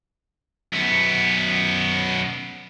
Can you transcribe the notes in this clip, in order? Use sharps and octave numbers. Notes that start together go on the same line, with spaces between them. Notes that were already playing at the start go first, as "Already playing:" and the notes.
F#2 B3